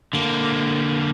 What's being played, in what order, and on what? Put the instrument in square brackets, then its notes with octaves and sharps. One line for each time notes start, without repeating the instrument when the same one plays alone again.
[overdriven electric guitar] D3 A#3